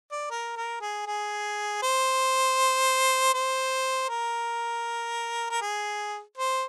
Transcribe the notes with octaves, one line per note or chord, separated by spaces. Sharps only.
D5
A#4
A#4
G#4
G#4
C5
C5
A#4
A#4
G#4
C5